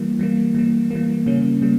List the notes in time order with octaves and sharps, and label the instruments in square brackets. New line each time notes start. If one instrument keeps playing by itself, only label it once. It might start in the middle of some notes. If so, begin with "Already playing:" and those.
Already playing: [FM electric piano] E3 G3 A#3
E3 G3 A#3
E3 G3 A#3
E3 G3 A#3
C#3 G3 A#3 C#4
C#3 G3 A#3